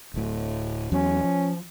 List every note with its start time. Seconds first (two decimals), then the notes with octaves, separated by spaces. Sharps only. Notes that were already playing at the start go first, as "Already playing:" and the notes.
0.14 D1 A2
0.92 E2 F#3 C#4
1.24 F3